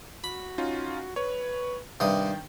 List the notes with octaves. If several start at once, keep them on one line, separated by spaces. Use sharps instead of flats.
F#4 B5
C#4 D#4 F4
B4 C#5
G2 C3 D#3 G5 D#6